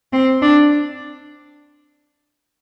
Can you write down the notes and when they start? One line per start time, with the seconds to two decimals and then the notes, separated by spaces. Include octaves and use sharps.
0.13 C4
0.42 D4